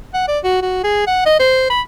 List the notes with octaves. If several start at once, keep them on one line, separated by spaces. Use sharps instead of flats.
F#5
D5
F#4
F#4
G#4
F#5
D#5
C5
B5